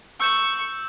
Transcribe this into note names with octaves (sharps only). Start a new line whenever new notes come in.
C#6 E6 G6 E7